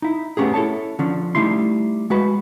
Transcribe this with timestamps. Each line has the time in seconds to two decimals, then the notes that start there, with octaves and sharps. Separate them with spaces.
0.02 D#4 E4
0.37 A3 B3 C#4 G4 G#4
0.54 E4 A4 C#5 A5
0.99 D3 F3 C#4 D4
1.35 G3 A3 D#4 E4 C6
2.10 G#3 F#4 B4 B5